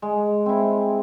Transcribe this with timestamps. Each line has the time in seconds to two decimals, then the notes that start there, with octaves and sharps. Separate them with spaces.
0.02 G#3
0.46 C4 E4